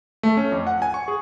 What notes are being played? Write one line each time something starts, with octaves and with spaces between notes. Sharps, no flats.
A3
C#4
F2
F#5
G#5
C#6
G#4